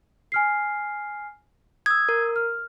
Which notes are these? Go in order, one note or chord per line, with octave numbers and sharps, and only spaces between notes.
G#5 F6 C7
D#6 E6 G#6
A#4
F6